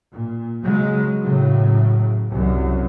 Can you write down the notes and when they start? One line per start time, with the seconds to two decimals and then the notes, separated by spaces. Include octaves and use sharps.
0.11 A#2
0.64 C#3 F#3 G#3
1.22 A2 C#3 F#3
2.30 C2 F#2